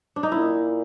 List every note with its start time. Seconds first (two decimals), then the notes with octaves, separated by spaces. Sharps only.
0.16 D4
0.23 D#4
0.31 A#2 E4